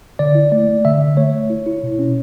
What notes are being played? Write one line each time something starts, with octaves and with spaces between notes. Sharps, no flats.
D3 D5
E4
A3 D5
A3
D3 E5
D3
A3 C#5
A3
E4
E4
B2
C#4